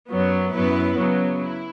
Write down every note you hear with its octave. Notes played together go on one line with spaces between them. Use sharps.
F#2 F#3 B3
F#2 F#3 B3 E4 B4
C#3 F#3 B3
E4